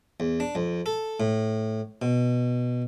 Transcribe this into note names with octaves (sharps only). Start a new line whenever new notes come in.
E2
D4
F2
A4
A2
B2